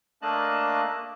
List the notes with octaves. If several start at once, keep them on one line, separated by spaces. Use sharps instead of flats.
A3 A#3 D4 D#5 A5 F#6